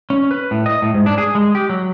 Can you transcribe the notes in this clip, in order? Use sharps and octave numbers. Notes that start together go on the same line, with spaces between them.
C#4
B4
A2
D#5
A2
G#2
D4
G#4
G#3
G4
F#3